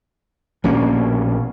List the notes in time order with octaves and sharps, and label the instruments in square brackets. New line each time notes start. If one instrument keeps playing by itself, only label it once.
[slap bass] A#1 B2 A#3 C#4